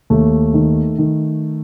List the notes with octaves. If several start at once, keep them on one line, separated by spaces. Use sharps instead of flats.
D#2 A3
D#3
D#3